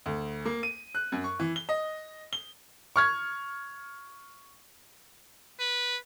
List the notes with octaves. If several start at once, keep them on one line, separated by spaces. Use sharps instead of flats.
D2
A#3
D#7
F#6
F#2
C#6
E3
G7
D#5
G7
C#6 F6 G#6
B4